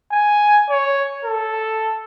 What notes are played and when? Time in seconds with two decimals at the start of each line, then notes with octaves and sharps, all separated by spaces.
0.12 G#5
0.70 C#5
1.25 A4